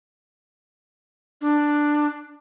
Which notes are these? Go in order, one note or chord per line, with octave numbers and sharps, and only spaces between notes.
D4